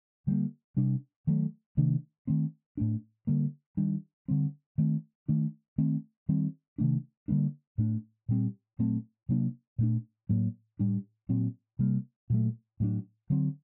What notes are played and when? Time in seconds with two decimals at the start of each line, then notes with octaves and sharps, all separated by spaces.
0.27 D3 G3 A#3
0.77 C3 G3 D4
1.27 D#3 F#3 A3
1.77 C3 D#3 A3 D4
2.27 D#3 A3 C4
2.77 A2 A3 D4
3.27 D3 G3 A#3
3.77 D#3 G3 D4
4.28 D3 G3 C4
4.78 D#3 A3 C4
5.28 D#3 A3 D4
5.78 D#3 A3 C4
6.29 D#3 G3 C4
6.78 C3 D#3 A3 D4
7.28 D3 G3 A#3 D4
7.78 A2 A3 D4
8.29 A#2 G3 C4
8.79 A#2 F#3 A3 C4
9.29 C3 F#3 A#3 D4
9.79 A#2 A3 D4
10.29 A2 F#3 A#3
10.79 A2 G3 D4
11.29 A#2 F#3 C4
11.79 C3 G3 A#3
12.30 A#2 F#3 A3
12.80 A2 F#3 A#3 D4
13.30 D3 F#3 C4